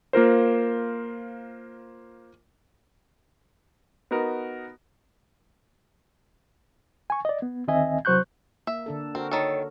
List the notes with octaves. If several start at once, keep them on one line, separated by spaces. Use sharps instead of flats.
A#3 F4 A#4 C5
B3 D#4 F#4 A#4
G#5 C#6
D5 D#5
B3
D2 D#3 C4 D#5 E5 G#5
C2 F#3 C5 C#6 F#6 G6
A#3 E5
D3 D4 A4
C4 F#4 A#4
D#3 A4 C#5